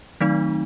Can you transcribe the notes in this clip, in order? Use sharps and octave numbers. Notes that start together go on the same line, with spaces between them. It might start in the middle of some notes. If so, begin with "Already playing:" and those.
D#3 F#3 A3 C4 D#4